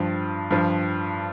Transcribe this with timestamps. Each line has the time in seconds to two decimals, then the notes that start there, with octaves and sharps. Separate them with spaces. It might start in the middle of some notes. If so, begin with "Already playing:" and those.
Already playing: G2 F3
0.51 G2 F3